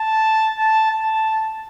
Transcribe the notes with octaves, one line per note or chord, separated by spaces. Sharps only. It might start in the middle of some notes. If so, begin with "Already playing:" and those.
Already playing: A5
A5
A5